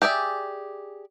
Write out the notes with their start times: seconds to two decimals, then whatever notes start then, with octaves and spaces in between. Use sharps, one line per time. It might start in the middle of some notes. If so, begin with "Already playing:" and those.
0.02 G4 G#4 D5 E5